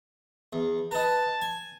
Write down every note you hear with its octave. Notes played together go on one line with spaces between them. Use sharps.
E2
D#4 B4 A5
G#5